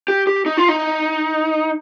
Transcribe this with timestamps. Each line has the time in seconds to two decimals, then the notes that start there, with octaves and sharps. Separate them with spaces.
0.08 G4
0.27 G4
0.46 D#4
0.57 F4
0.68 D#4